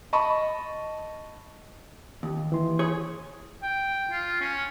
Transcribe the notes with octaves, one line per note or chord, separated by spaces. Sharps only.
D#5 A5 B5 C#6
D#2
E3 C6
G#4 C#5
G5
F4
C#4